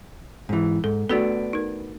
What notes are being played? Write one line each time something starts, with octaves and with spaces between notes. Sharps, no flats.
G#2 E3
G#2 A4
A3 B3 D4 F#4 A4
D#4 A#4